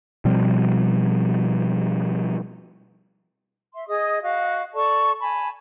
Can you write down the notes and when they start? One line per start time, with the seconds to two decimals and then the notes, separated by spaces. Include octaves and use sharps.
0.25 B2 F3 G3 C4
3.74 E5 C6
3.88 G#4 D#5 D#6
4.22 F#4 D#5 F5
4.74 A4 D5 A5 C#6
5.20 G#5 A5 B5